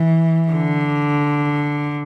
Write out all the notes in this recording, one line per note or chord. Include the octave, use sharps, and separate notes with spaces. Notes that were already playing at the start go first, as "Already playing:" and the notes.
Already playing: E3
D3